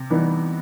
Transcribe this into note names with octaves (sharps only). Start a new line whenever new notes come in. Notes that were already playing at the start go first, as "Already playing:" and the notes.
Already playing: C3
E3 G3 B3 D#4